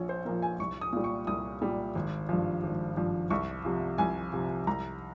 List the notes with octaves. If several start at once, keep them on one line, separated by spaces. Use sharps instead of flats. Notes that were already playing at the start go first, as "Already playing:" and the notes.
Already playing: A#1 A#2 F3 C#5
C5
A#2 F3 A#4
G#5
C2 C#6
D#6
A#2 G3
C#6
C2 D#6
A#2 G3
G#1
G2 F3
G#1
G2 F3
C2 C#6
C3 F3
C2 G#5
C3 F3
C2 A#5